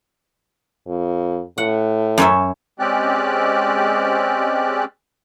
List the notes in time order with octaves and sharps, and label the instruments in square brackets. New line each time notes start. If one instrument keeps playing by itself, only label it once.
[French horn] F2
[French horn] A2 [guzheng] F#5
[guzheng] F#2 C#4 E5
[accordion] G#3 C4 C#4 G4 D5 F#6